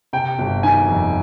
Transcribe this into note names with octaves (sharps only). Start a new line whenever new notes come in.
C3 G5
G1
D#3 G#5
F2